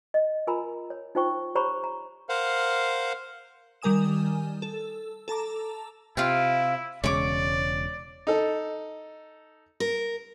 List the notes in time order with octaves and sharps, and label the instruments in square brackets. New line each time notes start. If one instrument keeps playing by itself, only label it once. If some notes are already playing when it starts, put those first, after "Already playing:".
[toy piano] D#5
F4 A#4 G#5 A#5 B5 E6
C#5
D#4 F4 C5 G5 C#6
G4 C5 C#5 A#5 B5 C#6
A#5
[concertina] A#4 C5 F5 F#5
[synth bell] D#3 G3 A#4 G#5 D#6 E7
A4
A4 A5 A#5 D6
[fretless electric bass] C3 [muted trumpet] E4 [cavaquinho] F4 F5 G5
[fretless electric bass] E1 C#3 G#3 [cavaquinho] C#5 D6 [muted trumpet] D5
[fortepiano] D#4 A4
[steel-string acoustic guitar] A#4